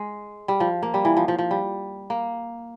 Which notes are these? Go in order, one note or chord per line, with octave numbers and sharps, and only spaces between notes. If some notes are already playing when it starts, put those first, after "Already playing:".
Already playing: G#3
G3
F3
A#3
G3
E3
F3
F3
F3
G3
A#3